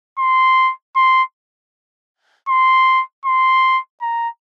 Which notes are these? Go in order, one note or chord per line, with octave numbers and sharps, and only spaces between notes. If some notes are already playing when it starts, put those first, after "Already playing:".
C6
C6
C6
C6
A#5